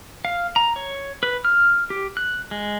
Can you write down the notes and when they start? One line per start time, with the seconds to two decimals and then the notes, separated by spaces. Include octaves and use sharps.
0.25 F5
0.56 A#5
0.76 C#5
1.23 B4
1.45 F6
1.90 G4
2.17 F#6
2.51 G#3